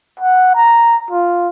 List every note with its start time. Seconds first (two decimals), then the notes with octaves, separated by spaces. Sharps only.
0.19 F#5
0.55 A#5
1.11 F4